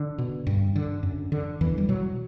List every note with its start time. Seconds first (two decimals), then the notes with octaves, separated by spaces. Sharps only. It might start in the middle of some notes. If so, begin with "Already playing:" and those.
Already playing: D3
0.18 B2
0.47 G2
0.76 D3
1.03 F#2
1.32 D3
1.61 E2 E3
1.78 G3
1.89 B2 F#3